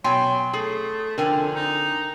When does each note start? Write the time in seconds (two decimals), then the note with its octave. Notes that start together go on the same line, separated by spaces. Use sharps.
0.04 B2 F#3 G5 G#5 C6
0.53 A3 G#4
1.18 F2 D3 A#4 G5 G#5
1.55 D#4